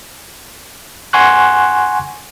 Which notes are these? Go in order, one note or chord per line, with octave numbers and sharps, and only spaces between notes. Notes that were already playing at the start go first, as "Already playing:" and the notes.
F#5 G#5 C6 C#6 F#6